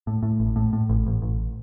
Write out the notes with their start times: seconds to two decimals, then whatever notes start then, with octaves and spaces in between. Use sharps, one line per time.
0.07 A2
0.23 A2
0.40 A1
0.56 A2
0.73 A2
0.89 A1
1.06 A1
1.22 A1